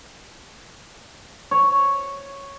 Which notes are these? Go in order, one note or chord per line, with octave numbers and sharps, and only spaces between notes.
C#5